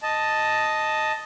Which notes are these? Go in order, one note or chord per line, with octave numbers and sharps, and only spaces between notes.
D#5 A5